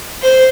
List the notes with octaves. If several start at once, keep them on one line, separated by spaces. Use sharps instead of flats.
C5